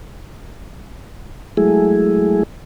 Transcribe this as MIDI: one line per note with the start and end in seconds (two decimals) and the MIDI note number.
1.57 2.43 54
1.57 2.43 56
1.57 2.43 57
1.57 2.43 64
1.57 2.43 68